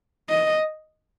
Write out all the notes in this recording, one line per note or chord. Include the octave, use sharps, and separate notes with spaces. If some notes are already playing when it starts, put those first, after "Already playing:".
D#5